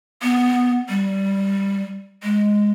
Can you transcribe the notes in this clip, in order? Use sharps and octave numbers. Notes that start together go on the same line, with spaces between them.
B3
G3
G#3